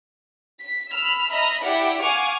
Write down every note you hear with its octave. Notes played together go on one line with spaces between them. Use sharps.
B6
B5 E6 F6
D#5 E5 A#5 B5 F6
E4 G4 D5 F#5
F5 F#5 G#5 C#6 D6 F6